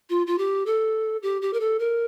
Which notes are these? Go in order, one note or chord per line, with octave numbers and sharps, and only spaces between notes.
F4
F4
G4
A4
G4
G4
A#4
A4
A#4